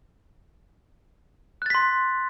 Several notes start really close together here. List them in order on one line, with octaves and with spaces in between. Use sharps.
F#6 A6 B6 C6